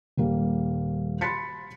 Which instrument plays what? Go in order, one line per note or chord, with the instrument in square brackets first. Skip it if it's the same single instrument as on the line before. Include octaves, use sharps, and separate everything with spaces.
[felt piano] D#1 G3 A#3
B5 C6 F#6 A6 B6 C#7